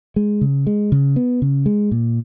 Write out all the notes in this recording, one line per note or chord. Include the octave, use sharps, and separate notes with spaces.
G#3
C#3
G#3
C#3
B3
C#3
G#3
A#2